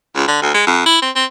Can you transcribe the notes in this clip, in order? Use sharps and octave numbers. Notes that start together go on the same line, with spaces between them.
C#2
D3
D2
G#3
F2
E4
C4
C4